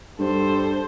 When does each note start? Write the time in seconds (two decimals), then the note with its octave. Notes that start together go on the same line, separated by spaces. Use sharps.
0.19 G2 A4 C5